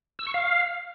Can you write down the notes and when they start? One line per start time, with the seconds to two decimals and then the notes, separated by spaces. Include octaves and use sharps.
0.19 E6
0.27 C#6
0.34 F5